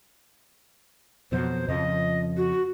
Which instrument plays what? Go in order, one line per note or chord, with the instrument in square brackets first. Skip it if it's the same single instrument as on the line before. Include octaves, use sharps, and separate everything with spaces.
[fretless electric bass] F2 B2 F#3 [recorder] C5
[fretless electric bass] F2 C#3 F3 [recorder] D#5
[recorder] F#4